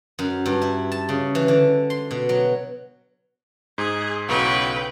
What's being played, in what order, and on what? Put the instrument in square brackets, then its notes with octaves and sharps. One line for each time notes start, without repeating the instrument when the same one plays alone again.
[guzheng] F#2
G2
E4
A5
C#3
E3
D3
C6
B2
F#3
[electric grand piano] G#2 [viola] G#4
[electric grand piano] B1 C#3 [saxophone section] E3 F#3 [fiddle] B4 [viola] G5